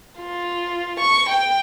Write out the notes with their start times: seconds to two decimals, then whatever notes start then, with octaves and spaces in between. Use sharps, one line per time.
0.20 F4
1.00 C#6
1.29 G5